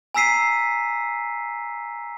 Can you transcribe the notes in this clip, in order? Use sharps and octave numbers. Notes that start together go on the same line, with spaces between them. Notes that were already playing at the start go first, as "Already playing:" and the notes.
G#5 A#5 E6 B6 C7 D#7